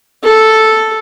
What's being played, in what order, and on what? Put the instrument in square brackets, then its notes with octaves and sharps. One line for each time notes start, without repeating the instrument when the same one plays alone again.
[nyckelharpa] A4